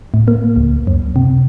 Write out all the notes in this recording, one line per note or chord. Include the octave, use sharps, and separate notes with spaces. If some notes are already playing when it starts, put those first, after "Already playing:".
A2
A#3
C#2
F#2
C3